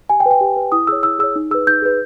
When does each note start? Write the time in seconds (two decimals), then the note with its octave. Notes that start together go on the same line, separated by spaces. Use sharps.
0.10 G4 G#5
0.20 G5
0.26 B4
0.31 G5
0.41 G4
0.56 B4
0.72 E4 D#6
0.87 G#4 C#5 E6
1.03 E4 E6
1.19 G#4 C#5 E6
1.36 D#4
1.51 G#4 B4 E6
1.67 D#4 G6
1.82 G#4 B4